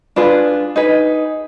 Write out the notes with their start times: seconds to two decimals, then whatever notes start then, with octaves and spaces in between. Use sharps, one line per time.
0.16 D4 F4 G#4 B4
0.76 D#4 G#4 B4